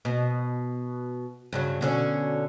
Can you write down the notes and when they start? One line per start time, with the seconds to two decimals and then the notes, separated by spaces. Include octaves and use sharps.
0.05 B2
1.53 G2 C#3 F#3
1.81 B2 D3 C#4